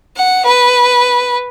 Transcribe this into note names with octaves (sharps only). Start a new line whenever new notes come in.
F#5
B4